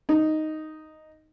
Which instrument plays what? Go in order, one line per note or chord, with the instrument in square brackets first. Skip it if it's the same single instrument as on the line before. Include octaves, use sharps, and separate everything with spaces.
[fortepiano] D#4